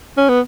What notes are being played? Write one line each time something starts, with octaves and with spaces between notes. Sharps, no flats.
C#4
B3